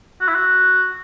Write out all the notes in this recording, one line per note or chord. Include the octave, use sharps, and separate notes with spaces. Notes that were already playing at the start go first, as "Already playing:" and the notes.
F#4
E4
F#4